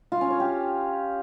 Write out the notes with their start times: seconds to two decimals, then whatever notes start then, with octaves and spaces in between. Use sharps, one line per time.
0.12 F4
0.21 C#4
0.30 C#5
0.40 G4